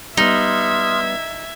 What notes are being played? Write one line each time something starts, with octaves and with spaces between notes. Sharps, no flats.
G3 B3 D#4 E5 C6 D#6 F6 G#6